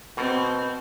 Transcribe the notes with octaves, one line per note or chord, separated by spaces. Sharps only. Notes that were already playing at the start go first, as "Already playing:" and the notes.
B2 C4